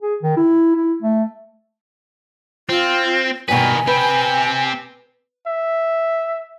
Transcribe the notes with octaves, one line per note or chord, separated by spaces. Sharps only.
G#4
D#3
E4
E4
A3
C4 F4
G2 B2 D#3 B4 G#5
C4 G4 B4
E5